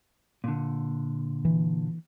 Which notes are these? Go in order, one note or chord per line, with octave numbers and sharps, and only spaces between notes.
A#2 D3
E3